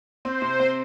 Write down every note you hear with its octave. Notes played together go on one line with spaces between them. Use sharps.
C4 C5
C3
C4